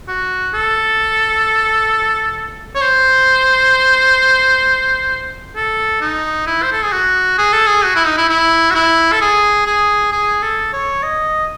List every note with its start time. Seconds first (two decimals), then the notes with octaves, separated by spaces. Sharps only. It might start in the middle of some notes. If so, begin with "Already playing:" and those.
0.08 F#4
0.54 A4
2.75 C#5
2.82 C5
5.56 A4
6.01 D#4
6.47 E4
6.63 C5
6.72 A4
6.83 G#4
6.92 F#4
7.38 G#4
7.53 A4
7.67 G#4
7.84 F#4
7.95 E4
8.06 D#4
8.18 E4
8.29 E4
8.71 F#4
8.75 E4
9.12 A4
9.21 G#4
9.66 G#4
10.12 G#4
10.42 A4
10.73 C#5
11.03 D#5